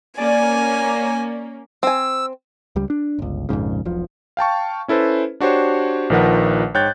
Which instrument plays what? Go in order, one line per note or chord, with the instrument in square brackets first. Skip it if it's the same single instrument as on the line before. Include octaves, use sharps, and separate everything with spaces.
[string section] A#3 C#4 [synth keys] D5 [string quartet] G#5
[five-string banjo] C4 G#5 [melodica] E6
[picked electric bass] C#2 G3
D4
G1 C#2
A#1 F2 G#2 C#3
E1 B1 F3
[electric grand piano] F5 G5 A5 C#6
C#4 E4 A4 B4 C5
D4 F#4 G4 C5 C#5
A#1 D#3 F3 A#4 B4 F#5
G#2 C#5 G5 F#6 G6 A6